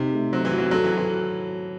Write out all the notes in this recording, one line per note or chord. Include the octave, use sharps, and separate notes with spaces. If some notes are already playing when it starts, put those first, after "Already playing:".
Already playing: C3 D#4
A3
F#3 C5
E3
F#4
F#3
F#3 A4
E3
F#4
E3